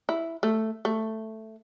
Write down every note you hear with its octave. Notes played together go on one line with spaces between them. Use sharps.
E4
A3
A3